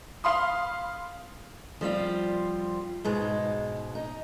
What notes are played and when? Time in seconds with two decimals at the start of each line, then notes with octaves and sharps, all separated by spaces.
0.24 F5 B5 C6 D#6
1.81 F3 G3 C4 F4
3.04 G#2 B2 G#3
3.95 D#4